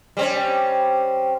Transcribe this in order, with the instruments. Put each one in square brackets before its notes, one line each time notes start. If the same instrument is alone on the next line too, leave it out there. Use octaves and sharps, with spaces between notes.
[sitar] G3 C4 C#4